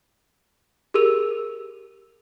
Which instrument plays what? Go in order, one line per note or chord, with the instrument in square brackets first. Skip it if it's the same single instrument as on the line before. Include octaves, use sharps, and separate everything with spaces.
[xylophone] G4 G#4 A#4 E6 D#7 F7